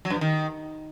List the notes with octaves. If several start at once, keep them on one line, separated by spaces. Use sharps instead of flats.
F#3
G2
F3
D#3